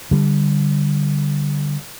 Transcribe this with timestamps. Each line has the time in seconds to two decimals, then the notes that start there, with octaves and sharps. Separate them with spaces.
0.11 D3 G3